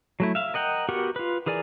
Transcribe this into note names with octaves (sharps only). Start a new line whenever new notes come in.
F#3 A3 E4
E5 F5
A#4 D#5 F#5 G5 A#5
B3 F#4 G4 A#4 F#5
F4 B4
E3 G#4 A#4 D5 G#5